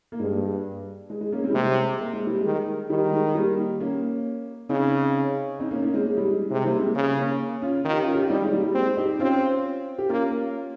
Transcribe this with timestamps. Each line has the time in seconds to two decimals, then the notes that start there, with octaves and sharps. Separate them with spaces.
0.12 A#3
0.20 G2 G#3
1.10 G#3
1.21 G#3
1.32 A#3 C#4
1.44 G#3 C4
1.50 G3
1.55 C3 G#3
2.00 A#3
2.13 G#3
2.27 G3
2.41 D#3 G#3
2.90 D#3 G3
3.12 G#3
3.35 G3 A#3
3.80 A#3 C#4
4.69 C#3 C4 D#4
5.59 C4 D#4
5.71 A#3 C#4
5.82 A#3 C#4
5.94 G#3 C4
6.05 G#3
6.17 G3
6.27 G#3
6.50 C3 G#3
6.65 G3 A#3
6.80 G#3 C4
6.95 C#3
7.17 A#3 C#4
7.62 C#4 F4
7.85 D#3 F4
7.93 G4
8.02 C#4 F4
8.15 G4
8.22 F4
8.29 G3 C4 D#4
8.41 G#3 C4
8.52 G3 A#3
8.64 G3
8.75 G#3 C4
8.97 D#4 G4
9.19 C4 C#4 F4
9.98 G4
10.09 A#3 C#4 F4